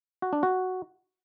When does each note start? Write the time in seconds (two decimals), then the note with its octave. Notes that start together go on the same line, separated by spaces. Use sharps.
0.22 F#4
0.33 D4
0.43 F#4